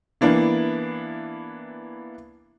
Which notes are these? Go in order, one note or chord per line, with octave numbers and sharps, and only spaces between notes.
E3 A#3 B3 D4 E4